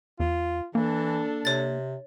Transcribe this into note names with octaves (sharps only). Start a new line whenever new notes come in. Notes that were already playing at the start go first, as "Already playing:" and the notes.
E2 F4
E3 A#3 D4 A4
C3 C#5 A6